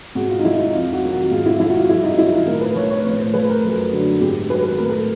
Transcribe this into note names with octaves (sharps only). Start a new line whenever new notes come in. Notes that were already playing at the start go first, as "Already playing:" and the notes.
G#2 F#4
F4
D#4
F3 E4
D#4
F2 F4
F#4
C3 D#3 F#3
F#4
G#2 F4
E4
F3 E4
F#4
F4
G2 E4
D#4
D#3 F#3 E4
F4
A2 A#4
B4
F3 C#5
C#5
A2 C#5
C5
F3 B4
A#4
F#2 A4
D3 F#3
G#2 G4
D#3 F#3 B4
B4
A2 A#4
A4